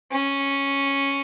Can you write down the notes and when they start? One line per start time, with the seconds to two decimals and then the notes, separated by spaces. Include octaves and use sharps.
0.12 C#4